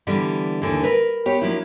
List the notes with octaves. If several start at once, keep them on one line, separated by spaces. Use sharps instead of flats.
D3 E3 G3 B3
D#2 D3 E3
A#4 B4
B3 G4 C#5
F3 F#3 A#3 D4 E4